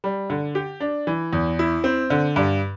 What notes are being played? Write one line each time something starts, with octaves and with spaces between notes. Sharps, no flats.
G3
D3
G4
D4
E3
E2
E4
C4
D3
G2